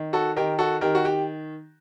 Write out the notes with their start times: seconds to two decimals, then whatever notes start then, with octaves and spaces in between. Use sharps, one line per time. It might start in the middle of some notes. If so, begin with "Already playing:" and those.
Already playing: D#3
0.13 F#4 A4
0.36 D#3 G4 A#4
0.59 F#4 A4
0.81 D#3 G4 A#4
0.95 F#4
1.05 G4